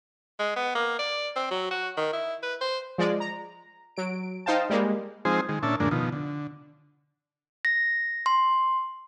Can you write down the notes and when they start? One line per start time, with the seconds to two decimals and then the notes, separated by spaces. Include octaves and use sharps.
0.40 G#3
0.56 B3
0.75 A#3
0.99 D5
1.37 C4
1.51 F#3
1.71 F#4
1.97 D#3
2.13 E4
2.43 B4
2.61 C5
2.98 F3 G#3 D5
3.20 A#5
3.97 F#3 D7
4.46 D#4 C5 F5 G5 A5
4.70 G3 G#3 A#3
5.25 F3 G#3 C4 D#4 G#4 C5
5.49 D#3 G#3
5.63 A#2 C#4 D4 E5 A5
5.80 F2 A2 D3 G#3 A#3 D4
5.91 B2 D#3 F3
6.12 D3
7.65 A#6
8.26 C6